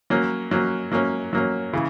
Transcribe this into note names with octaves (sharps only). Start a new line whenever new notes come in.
F#3 A#3 C#4
F#3 A#3 C#4
F#3 A#3 C#4
F#3 A#3 C#4
C#3 E3